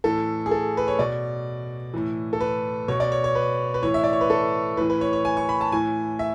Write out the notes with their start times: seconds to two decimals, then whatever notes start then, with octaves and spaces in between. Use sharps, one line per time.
0.04 A2 E3 A4
0.46 G#4
0.51 A4
0.77 B4
0.88 C#5
0.99 B2 D5
1.94 A2 E3
2.33 A4
2.40 B4
2.88 B2 C#5
3.00 D5
3.12 C#5
3.24 C#5
3.35 B4
3.74 B4
3.83 A2 E3 C#5
3.94 E5
4.04 D5
4.13 C#5
4.21 B4
4.30 A4
4.77 A2 E3 B4
4.90 B4
5.01 C#5
5.13 C#5
5.25 G#5
5.37 C#6
5.49 B5
5.61 A5
5.72 A2 E3 G#5
6.19 E5